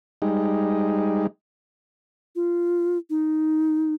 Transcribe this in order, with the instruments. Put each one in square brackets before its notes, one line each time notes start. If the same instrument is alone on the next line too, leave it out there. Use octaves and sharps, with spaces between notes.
[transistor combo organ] G3 G#3 D#4
[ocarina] F4
D#4